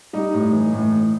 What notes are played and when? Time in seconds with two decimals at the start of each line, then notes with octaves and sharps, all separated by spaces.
0.13 G3 D#4
0.34 A2
0.53 E3
0.72 A2
0.92 A2